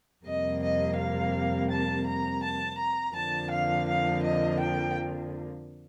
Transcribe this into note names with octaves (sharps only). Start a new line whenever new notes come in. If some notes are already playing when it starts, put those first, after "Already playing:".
F2 C3 G3 A#3 D#5
D#5
F5
A5
A#5
A5
A#5
F2 D3 F3 A#3 A5
F5
F5
D#5
G5